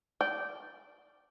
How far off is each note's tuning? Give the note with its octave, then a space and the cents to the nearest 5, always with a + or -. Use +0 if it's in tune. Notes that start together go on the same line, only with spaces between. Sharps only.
D5 +0 G5 -15